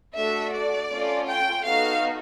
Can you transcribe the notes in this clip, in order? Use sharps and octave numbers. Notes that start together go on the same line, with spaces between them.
A3 D4 F#4 A4 E5
D5
A3 C#4 F4 A4
G5
B3 D#4 F#4 A4 F5